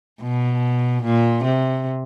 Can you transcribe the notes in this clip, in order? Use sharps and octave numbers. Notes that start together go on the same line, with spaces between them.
B2
A#2
C3